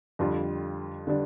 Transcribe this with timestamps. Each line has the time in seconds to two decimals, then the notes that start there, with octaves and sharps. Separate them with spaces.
0.19 F2 D3 G3 D4 F4
1.07 D3 G3 D4